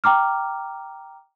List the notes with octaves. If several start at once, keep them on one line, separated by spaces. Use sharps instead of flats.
G5 A#5 D6 F6